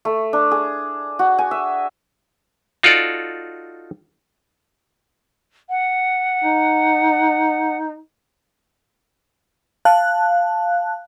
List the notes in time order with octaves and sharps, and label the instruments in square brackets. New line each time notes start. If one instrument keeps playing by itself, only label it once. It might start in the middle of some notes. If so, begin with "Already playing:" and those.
[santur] A3
D4
G#4
F#4
G#5
E5
[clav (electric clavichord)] D#4 F4 F#4 A4 D5
[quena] F#5
[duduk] D#4
[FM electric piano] F5 A5 F#6